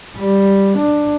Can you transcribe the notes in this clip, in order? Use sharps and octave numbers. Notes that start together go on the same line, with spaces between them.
G3
D4